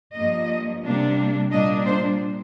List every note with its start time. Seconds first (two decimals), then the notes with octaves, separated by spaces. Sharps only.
0.16 G2 F3 A#3 D#5
0.84 C3 G3 A#3 D4
1.51 A#2 G3 A#3 D4 D#5
1.86 C5